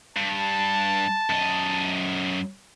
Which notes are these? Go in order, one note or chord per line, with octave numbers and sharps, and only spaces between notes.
G2 A5
F#2 D#5